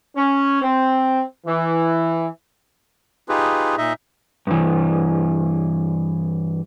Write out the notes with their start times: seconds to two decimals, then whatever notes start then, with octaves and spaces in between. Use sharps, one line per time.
0.16 C#4
0.62 C4
1.46 E3
3.29 D#4 F4 G4 G#4 B4
3.77 A#2 D#4 D#5 E5
4.47 G2 E3